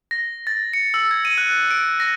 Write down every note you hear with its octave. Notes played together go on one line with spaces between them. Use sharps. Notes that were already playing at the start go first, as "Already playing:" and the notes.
A#6
A6
C#7
E6
G#6
D#7
F#6
D7
A#6